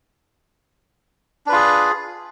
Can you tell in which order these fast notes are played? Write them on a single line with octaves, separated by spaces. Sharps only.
D4 B4 F4 G#4